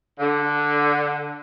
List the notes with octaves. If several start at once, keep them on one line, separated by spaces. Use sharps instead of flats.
D3